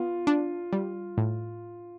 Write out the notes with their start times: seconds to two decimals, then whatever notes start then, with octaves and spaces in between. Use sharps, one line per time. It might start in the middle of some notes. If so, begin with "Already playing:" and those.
Already playing: B3 F4
0.27 D4
0.73 G3
1.18 A2